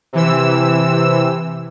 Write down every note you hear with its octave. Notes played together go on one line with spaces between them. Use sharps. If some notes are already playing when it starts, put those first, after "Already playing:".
C3 E3 E6